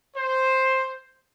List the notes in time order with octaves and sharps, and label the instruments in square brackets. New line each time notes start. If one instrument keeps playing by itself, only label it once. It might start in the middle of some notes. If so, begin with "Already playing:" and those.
[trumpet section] C5